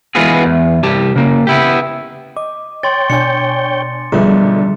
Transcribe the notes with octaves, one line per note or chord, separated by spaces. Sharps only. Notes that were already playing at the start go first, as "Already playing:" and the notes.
E3 G#3 B3 F4 F#4 G#4
E2
C2 G4 A5
C#3 A#3
B3 E4 G4
D#5 D6
C#5 G5 C6 A6
B2 D4 G#5 G6 C#7
B1 D3 F3 G3 A3 B3 G#4